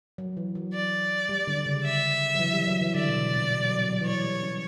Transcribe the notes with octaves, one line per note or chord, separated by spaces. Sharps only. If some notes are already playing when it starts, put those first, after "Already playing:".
F#3
E3
F#3
D5
G3
D3
C#3
E5
F#3
E3
G3
F#3
E3
D3 D5
B2
B2
A#2
B2
F#3
F#3
G3
E3
F#3 C#5
G3
C#4